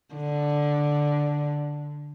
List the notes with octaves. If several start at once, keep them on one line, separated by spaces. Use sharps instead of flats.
D3